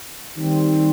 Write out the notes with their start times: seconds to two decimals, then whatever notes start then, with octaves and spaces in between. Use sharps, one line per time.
0.37 D#3 G3 C4